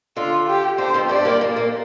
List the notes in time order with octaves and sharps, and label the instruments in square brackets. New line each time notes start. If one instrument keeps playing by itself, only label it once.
[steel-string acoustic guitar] D3 [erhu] F4
[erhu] G4
[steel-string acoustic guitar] D3 [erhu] C5
[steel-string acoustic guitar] F2 F3
[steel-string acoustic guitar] G2 G3 [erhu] D5
[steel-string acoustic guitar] A#2 A#3
A#2 A#3
A#2 A#3